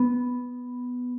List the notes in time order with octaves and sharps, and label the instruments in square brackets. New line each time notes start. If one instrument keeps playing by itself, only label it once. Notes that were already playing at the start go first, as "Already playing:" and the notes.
Already playing: [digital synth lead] B3